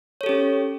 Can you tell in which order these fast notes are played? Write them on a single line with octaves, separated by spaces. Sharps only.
C#5 A4 G4 C#4